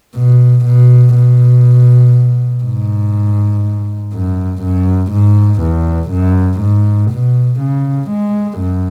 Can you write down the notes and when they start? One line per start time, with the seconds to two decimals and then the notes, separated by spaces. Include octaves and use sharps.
0.16 B2
0.66 B2
1.15 B2
2.64 G#2
4.14 F#2
4.63 F#2
5.13 G#2
5.62 E2
6.11 F#2
6.61 G#2
7.12 B2
7.61 C#3
8.11 G#3
8.59 F#2